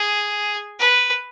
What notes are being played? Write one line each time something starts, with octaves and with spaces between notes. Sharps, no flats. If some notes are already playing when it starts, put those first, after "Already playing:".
Already playing: G#4
B4